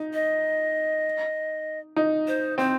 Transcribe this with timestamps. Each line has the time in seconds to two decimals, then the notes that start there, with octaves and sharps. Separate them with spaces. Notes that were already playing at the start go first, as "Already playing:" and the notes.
Already playing: D#4
0.14 D#5
1.96 D#4
2.28 C5
2.58 C4 C5